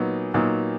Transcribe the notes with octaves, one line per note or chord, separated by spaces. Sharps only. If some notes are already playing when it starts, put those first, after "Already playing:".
Already playing: A#2 F#3 B3 D#4
A#2 F#3 B3 D#4